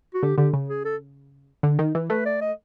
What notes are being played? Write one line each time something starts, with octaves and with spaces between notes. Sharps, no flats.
F#4
D3 G4
D3 G4
C#3
G#4
A4
D3
D#3
E3
A3 B4
D5
D#5